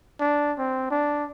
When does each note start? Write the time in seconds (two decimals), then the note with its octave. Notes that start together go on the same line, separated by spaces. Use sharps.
0.20 D4
0.58 C4
0.91 D4